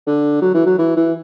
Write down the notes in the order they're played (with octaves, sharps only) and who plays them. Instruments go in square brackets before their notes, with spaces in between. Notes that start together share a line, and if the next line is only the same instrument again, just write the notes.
[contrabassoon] D3
F#3
E3
F#3
E3
E3